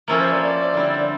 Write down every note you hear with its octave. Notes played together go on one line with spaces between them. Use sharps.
F3 A#3 C#4 E4 A4 A#4
C5
D5
D5
D3 G3 C4 E4